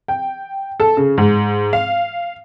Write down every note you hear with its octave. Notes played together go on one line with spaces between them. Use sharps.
G5
A4
C#3
G#2
F5